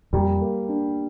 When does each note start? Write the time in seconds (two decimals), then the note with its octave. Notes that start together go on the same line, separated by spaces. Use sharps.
0.13 F2 A#2 G3
0.41 A#3
0.69 D4